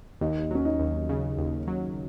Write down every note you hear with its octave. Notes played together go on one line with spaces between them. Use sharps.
D#2 D#4
F#3 C#4
D#4
D#2
C#3
D#2
F#3